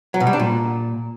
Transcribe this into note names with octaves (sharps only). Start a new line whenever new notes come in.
F#3
B2
G3
D4
A#2